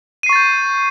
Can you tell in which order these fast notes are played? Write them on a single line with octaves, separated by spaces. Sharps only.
D#7 C7 C#6 A6 G6